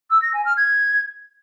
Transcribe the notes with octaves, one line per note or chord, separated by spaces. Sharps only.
E6
A#6
G#5
F6
G#6